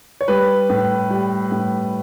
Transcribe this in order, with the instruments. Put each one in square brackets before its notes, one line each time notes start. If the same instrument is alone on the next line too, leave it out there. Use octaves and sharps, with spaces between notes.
[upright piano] C#5
G3 B4
A2
G3
A2